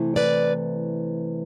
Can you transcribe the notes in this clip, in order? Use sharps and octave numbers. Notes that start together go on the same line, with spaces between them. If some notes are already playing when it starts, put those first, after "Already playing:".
Already playing: C3 E3 A3
B4 D5